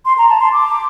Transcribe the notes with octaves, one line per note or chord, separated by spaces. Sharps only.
C6
A#5
A5
C6
D6